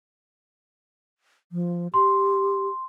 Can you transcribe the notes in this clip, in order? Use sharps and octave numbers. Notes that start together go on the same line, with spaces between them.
F3
G4 C6